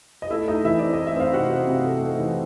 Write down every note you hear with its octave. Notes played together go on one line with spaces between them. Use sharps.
D#5
A3 E4 E5
A3 D#4 D#5
E3 E4 E5
C4 D5
D#5
A3
E5
C4 F5
C3 F#4 F#5
C4
C3
A3
A3
E3